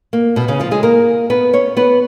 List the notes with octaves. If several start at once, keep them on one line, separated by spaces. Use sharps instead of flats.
A#3
B2 B3
C#3 C#4
F3 F4
G#3 G#4
A#3 A#4
B3 B4
C#4 C#5
B3 B4